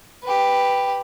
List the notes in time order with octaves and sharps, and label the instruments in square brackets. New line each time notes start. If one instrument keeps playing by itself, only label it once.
[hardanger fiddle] G4 B4